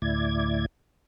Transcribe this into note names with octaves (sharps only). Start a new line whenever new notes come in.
D2 A2 E4 D5 G#6